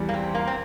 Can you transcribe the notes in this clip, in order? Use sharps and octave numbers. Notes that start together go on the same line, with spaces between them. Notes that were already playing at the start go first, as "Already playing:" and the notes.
Already playing: E2 E3 G3
A#3
C4
A#3
C4